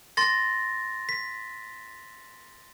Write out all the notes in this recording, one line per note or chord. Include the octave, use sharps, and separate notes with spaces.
C6 A6 A#6
B6